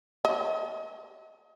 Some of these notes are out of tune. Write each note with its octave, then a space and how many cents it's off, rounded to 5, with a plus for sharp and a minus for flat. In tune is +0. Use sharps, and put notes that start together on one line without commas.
D#5 +35